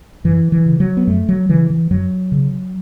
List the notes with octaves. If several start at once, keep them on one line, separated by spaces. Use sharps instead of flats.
F#2 E3
E3
C#3
F#3
B3
F#2 A3
F#3
C#3 E3
E3
F#2 F#3
C#3